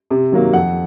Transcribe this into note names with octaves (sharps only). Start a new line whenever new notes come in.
C3
D#3 F#3 A#3
F2 F#5